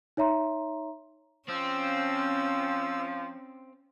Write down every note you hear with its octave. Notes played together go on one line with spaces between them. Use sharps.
D#4 C#5 E5 A#5 C6
F3 C4 C#4 E6